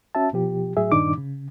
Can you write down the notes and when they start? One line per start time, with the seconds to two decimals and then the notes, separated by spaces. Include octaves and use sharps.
0.15 C#4 F#4 E5 A5
0.33 B2 F3 G4
0.77 A2 F#3 G#4 E5
0.92 G2 A#2 D#3 D4 D#4 D6
1.18 C#3